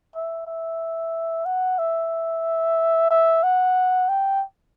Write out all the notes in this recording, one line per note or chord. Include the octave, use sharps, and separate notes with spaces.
E5
E5
F#5
E5
E5
F#5
G5